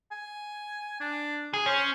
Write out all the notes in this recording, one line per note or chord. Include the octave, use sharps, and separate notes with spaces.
G#5
D4
G#4
C#4 C5